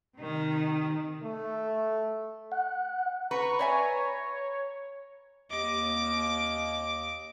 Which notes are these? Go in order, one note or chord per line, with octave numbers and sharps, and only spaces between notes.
C3 D#3
A3
F#5
B4 A#5 C#6
C#5 D5 E5 G#5
D#2 D#5 D6